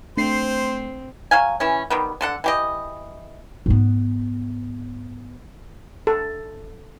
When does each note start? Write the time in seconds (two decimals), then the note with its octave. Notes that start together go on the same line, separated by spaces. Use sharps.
0.17 A3 C4 D4 C5 C7
1.31 F#3 F5 G#5
1.60 E3 C#4
1.90 D#3 G3 B3
2.21 D3 A4 F#5
2.44 E3 G4 D#5
3.66 G#2 B3
6.07 A4